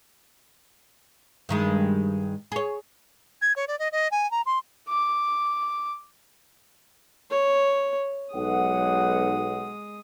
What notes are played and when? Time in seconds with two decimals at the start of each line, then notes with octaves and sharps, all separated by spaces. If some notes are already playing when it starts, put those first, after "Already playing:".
1.49 G2 D#3 G#3
2.52 G#4 C#5
3.42 G#6
3.56 C#5
3.68 D5
3.79 D#5
3.92 D#5
4.11 G#5
4.31 A#5
4.46 C6
4.88 D6
7.31 C#5
8.34 B1 G#3 F#5 D#6